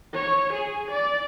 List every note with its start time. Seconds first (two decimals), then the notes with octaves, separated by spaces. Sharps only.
0.14 C#5
0.53 G#4
0.91 D5